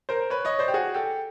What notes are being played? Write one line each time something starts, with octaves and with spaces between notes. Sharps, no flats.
A#4 C5
B4 C#5
C#5 D#5
C5 D5
G4
F#4 G#4
G4 A4